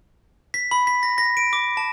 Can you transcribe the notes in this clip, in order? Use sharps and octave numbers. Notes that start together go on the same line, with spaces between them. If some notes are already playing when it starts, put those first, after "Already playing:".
B6
B5
B6
A#6
A#6
D7
D6
A5